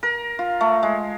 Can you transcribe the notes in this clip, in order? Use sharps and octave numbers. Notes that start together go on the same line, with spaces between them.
A#4
F4
A3
G#3